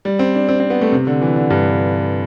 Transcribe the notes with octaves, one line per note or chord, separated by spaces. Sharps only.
G3
C4
D4
C4
C4
B3
A3
C3
D3
E3
D3
G2